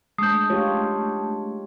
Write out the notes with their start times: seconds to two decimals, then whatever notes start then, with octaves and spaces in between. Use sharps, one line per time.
0.18 G#3 A3 D4 A5 D#6 G6
0.50 F4 G4 C#5